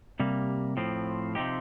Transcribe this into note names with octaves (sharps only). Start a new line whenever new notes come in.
C3 G3 A#3
A2 F3 C4
C3 F3 C4 D#4 G4